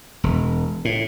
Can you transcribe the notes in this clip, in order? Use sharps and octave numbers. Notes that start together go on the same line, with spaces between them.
E1
A2